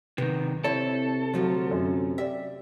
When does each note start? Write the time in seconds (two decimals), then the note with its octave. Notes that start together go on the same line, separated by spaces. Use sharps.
0.18 C3 D#3 B3
0.64 C3 C4 E4 A4 C#5
1.34 D2 F3 F#3 A3
1.71 F#2
2.18 G4 D5 E5